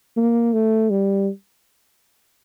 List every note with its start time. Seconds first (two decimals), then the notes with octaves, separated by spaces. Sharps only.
0.17 A#3
0.53 A3
0.90 G3